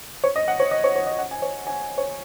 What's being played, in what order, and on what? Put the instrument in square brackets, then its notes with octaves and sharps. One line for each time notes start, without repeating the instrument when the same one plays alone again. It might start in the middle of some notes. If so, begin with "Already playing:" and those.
[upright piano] C#5
D#5
F#5
C#5
D#5
C#5
C#5
D#5
F#5
G#5
C#5
G#5
C#5